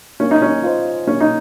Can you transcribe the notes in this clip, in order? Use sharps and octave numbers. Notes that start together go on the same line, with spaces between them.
A#3 C#4
D#4
C#4
F4 C5 D#5
A#3 C#4
D#4